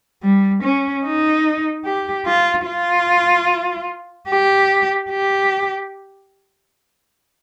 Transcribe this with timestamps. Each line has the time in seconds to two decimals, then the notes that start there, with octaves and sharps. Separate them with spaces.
0.23 G3
0.63 C#4
1.05 D#4
1.85 G4
2.26 F4
2.67 F4
4.30 G4
5.10 G4